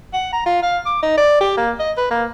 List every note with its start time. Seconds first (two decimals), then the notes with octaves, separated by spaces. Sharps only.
0.13 F#5
0.33 A#5
0.46 F4
0.63 F5
0.86 D6
1.02 D#4
1.18 D5
1.41 G4
1.57 A#3
1.79 D#5
1.97 B4
2.11 A#3